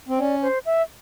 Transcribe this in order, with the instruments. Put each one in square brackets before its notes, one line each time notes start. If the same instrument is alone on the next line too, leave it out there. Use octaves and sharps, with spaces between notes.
[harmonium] C4
[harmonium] C#4 [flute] D5
[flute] C5
E5